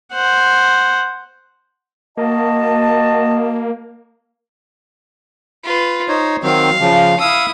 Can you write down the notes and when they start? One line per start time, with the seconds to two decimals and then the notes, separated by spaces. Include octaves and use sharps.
0.13 C5 F#5
2.17 A#3 F#4 D#5 A5
5.65 F4 B4
6.08 D#4 C5 C#5
6.43 D#3 F#3 C4 F5
6.80 C#3 F3
7.20 E4 F5 D#6 E6